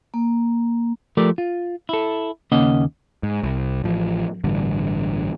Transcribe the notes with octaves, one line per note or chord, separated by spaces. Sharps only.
A#3
F3 A3 G4 A#4 D5
F4
E4 A4
D#2 C#3 A#3 C#4 D#5 F#5
G#2
C2
A1 F3
A1 G2 D3